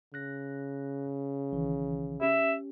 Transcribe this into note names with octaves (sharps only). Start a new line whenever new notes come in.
C#3 F#6 A#6
B1 D#3 E3
C#4 G4 E5